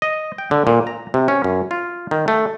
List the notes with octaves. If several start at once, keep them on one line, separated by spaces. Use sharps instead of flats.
D#5
G5
D3
A#2
A#5
C3
C#4
F#2
F4
D#3
A3